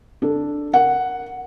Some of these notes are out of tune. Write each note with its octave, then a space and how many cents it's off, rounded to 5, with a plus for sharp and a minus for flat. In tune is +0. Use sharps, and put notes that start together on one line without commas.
D4 +0 A4 +0
A#4 +0 F#5 +0